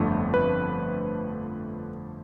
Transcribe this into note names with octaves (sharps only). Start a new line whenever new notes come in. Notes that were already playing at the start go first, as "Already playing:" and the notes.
Already playing: G1 F2 D3 F3 A3
B4